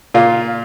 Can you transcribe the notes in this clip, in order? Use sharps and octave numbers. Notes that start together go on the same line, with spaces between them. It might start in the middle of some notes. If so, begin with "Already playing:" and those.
A#2 F4